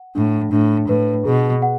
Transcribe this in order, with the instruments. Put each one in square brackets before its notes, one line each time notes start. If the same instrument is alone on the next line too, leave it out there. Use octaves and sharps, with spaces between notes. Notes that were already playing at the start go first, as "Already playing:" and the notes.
Already playing: [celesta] F#5
[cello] A2 [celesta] D4
[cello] A2 [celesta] D4
[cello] A2 [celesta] B4
[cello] B2 [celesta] G#4
[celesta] F#5